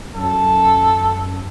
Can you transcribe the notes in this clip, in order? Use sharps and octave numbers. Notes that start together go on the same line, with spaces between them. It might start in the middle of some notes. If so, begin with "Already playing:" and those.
F#2 A4